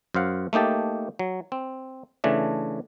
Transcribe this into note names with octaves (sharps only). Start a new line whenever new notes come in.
F#2 C5 F5 F#5
A3 A#3 D#4 G4 A5
F#3
C4
C#3 E3 A3 D4